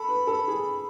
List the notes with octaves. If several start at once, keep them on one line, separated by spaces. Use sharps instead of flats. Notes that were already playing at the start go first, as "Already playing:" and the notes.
Already playing: A4 B5
B4
A4
G#4